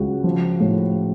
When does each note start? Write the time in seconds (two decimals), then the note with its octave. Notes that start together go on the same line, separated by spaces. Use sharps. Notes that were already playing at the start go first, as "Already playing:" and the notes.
Already playing: C#2 F#3 F#4
0.24 F3
0.60 A2